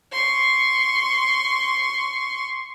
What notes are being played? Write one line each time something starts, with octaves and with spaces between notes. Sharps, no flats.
C6 C#6